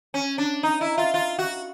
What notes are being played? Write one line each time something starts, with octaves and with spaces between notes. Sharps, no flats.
C#4
D4
D#4
E4
F4
F4
F#4